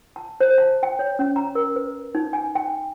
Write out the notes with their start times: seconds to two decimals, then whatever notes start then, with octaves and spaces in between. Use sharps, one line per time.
0.16 A5
0.40 C5
0.58 A5
0.83 G5
0.99 C#5
1.19 C#4
1.36 A#5
1.55 A#4
1.76 B4
2.15 D#4
2.33 G#5
2.55 G5